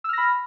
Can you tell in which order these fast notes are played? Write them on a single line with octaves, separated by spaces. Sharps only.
E6 F6 A#6 B5